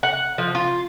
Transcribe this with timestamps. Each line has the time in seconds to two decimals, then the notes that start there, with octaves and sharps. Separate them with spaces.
0.03 F#5
0.38 F3
0.55 F4